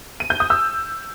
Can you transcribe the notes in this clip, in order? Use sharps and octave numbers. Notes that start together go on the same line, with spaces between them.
D#7
G6
D#6
E6